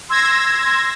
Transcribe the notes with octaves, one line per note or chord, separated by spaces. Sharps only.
C6 E6 G#6 A#6